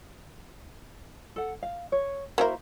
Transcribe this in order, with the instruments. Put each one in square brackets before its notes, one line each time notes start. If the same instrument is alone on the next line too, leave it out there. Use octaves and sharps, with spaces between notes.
[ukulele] A4 F#5
F5
C#5
[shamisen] A#3 E4 A#4 [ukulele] F#4 C5 E5